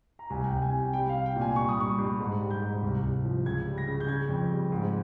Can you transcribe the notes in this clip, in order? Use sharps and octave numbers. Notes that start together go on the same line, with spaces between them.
A#5
C2 G#5
G5
C2
G#5
C3
G5
G3 G5
F5
G3
G5
A#2
G#5
G2 C#6
D#6
G2 C#6
G2
G#2
G3
G6
G#2
C2
C2
F3
C#2 G#6
G3
A#6
C#3
G6
C#3 G#6
F2
G3
G#2